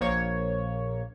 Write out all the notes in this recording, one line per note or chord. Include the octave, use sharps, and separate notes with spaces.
A#1 A#3 C#5